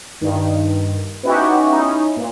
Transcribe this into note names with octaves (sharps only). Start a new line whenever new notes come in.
G2 D#3
B3 C#4 D#4 E4 F#4 G4
C#4 D#4 E4
A#2